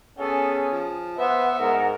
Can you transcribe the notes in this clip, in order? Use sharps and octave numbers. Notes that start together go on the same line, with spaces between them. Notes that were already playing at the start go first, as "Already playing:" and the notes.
B3 C#4 G#4 A4
F3
B3 B4 C5 E5 F#5
G#2 A#4 F#5